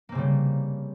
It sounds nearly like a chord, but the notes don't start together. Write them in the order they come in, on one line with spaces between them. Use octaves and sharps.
A#3 C4 C#3 G3